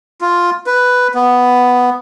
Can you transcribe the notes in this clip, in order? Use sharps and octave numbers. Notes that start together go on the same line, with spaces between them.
F4
B4
B3